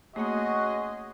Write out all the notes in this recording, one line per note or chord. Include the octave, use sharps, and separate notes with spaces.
A3 A#3 C#4 F#4 G#4 D#5 C6